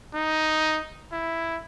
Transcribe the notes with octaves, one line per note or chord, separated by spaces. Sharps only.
D#4
E4